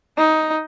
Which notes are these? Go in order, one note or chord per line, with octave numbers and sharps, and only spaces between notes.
D#4